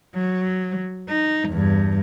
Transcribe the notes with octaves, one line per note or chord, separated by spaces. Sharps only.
F#3
D#4
E2 G2